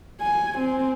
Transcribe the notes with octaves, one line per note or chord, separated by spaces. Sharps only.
G#5
C4